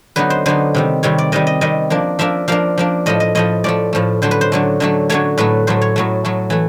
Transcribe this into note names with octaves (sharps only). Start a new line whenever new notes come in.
D3 F#3 B3 D#4 B4
C5
D3 F#3 B3 D#4 C5
C3 D#3 G3
C3 D#3 G3 C#5
D5
C3 D#3 G3 D#5
D#5
C3 D#3 G3 D#5
F3 A#3 D4
F3 A#3 D4 E5
F3 A#3 D4 F5
F3 A#3 D4
A2 F3 A3 D#5
D#5
A2 F3 A3 D#5
A2 F3 A3 D5
A2 F3 A3
D3 F#3 A3 C5
B4
C5
D3 F#3 A3
D3 F#3 A3
D3 F#3 A3 C#5
A2 F#3 A3 B4
A2 F#3 A3 C5
C#5
A2 F#3 A3
A2 F#3 A3
E3 A3